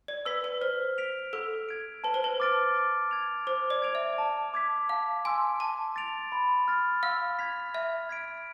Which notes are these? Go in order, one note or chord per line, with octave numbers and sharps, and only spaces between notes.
D5
B4 E6 B6
B4
C5 F6
B6 D7 F7
A4 E6
G#6 D7
B4 A5
C5
B4
D6 F6 A6 D7
D6
G#6 D7 F7
C5 D6
D5
G#6 D7 F7
E5
A5
D6 G#6 B6
F5 A5
G#5 C6 E6
A5 E6
A6 D7 F7
B5
F6 A6
F5 E6
G#6 B6 F7
E5 F6
G#6 B6 D7